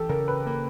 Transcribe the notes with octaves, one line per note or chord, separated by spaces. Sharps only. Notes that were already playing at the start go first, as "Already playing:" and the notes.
Already playing: E3 G4 A4
C#3 A#4
B4
A#3 A#4